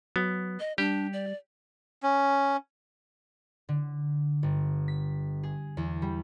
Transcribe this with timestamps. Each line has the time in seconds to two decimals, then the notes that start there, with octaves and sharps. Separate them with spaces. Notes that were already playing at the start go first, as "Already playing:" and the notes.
0.16 F#3 B3
0.60 D#5
0.78 G3 D4 G4
1.13 D5
2.03 C#4
3.69 D3
4.43 G1
4.88 B6
5.43 G#4
5.77 E2
6.02 G3